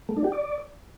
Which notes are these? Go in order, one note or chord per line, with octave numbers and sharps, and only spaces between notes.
A3
D4
G4
D5